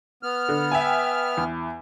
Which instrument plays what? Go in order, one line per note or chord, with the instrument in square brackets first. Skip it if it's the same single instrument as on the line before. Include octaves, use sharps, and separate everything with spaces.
[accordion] B3 F6
[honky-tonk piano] D3
E5 G5 G#5
E2